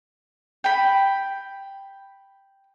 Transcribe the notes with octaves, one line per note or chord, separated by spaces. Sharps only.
G5 B5